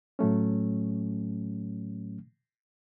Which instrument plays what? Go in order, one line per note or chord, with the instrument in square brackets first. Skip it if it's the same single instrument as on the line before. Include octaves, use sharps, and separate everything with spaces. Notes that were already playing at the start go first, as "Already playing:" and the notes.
[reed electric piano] A2 F#3 A3 C#4